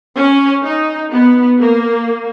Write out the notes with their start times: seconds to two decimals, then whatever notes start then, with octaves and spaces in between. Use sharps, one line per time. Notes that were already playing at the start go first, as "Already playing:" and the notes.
0.16 C#4
0.64 D#4
1.12 B3
1.60 A#3